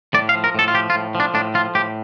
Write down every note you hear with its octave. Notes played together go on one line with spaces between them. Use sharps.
A2 D5
F5
F3
A#4
A2 A4
F4
F3 G4
F4
A2
F3
D4
A2 D4
F3 F4
A2 G4